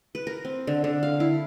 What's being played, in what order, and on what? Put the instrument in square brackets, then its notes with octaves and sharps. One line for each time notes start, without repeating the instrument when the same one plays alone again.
[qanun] B4
A#4
C4
D3
D3
F5
E4